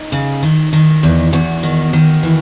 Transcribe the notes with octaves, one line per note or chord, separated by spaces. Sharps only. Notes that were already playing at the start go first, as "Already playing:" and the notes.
Already playing: D#4
C#3
D#3
D#3
E2
E2 F#4
D#3
D#3
E3